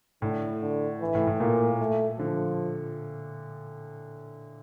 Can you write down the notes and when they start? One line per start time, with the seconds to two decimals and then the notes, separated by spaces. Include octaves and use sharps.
0.22 A2 D3
0.61 D3
1.01 E3
1.15 A2
1.27 A2
1.40 A#2 A#3
1.80 A3
2.18 D3 F3